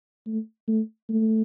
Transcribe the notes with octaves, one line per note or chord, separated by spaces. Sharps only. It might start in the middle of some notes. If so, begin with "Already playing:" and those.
A3
A3
A3